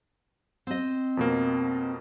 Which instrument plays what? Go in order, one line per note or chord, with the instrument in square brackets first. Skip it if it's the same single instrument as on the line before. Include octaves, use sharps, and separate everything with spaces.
[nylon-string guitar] C4 D#5
[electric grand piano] F2 B2 A#3